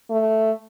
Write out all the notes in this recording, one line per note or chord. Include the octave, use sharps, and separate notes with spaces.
A3